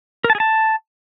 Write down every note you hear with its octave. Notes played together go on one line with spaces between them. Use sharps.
A#4
A5
G#4
A5